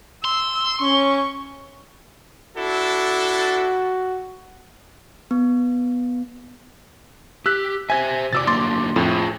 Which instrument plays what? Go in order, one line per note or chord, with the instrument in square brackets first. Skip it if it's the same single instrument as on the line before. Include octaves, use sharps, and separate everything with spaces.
[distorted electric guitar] C6 [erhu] E6
[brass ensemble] C#4 [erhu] C#6
[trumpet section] D4 E4 A4 [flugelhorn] F#4
[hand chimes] B3
[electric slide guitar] G4 [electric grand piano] E6 F#6 B6
[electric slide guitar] G4 C5 E5 [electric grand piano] G#5 G#6
[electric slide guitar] C3 F#4 D5 [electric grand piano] D6 E6 A6
[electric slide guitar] D3 F#3 A#3 [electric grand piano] C6 D6 A6
[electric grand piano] F2 A2 [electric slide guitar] F4 G#4